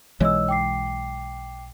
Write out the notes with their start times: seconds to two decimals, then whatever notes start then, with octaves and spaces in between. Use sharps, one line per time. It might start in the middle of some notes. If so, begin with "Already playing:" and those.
0.20 B1 E3 G#3 C#5 D#5 E6
0.49 G5 D6 C7